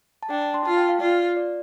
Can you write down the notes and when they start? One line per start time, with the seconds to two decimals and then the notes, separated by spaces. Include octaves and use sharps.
0.23 A5
0.30 D4 G5
0.42 A5
0.54 C6
0.65 F4 A5
0.77 G5
0.89 F5
1.00 F4 D5
1.36 D5